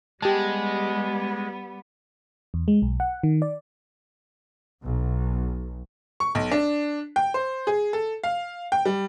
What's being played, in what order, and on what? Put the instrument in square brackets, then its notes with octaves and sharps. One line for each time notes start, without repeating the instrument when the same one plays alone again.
[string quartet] G3 B3 [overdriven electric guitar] G#3 [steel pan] G4 A5
[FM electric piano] E2
G#3
B1
F#5
D#3
D5
[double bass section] B1
[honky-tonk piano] C#6
B1
D4
G5
C5
G#4
A4
F5
G5
G3